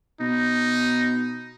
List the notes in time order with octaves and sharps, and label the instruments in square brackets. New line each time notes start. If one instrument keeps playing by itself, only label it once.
[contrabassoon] B2 [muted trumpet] D#4